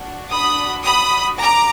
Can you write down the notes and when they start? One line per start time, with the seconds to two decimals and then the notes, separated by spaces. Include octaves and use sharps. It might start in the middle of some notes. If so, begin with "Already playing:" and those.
Already playing: D4 F#4
0.30 B5 D#6
0.84 B5 D#6
1.39 A#5 D6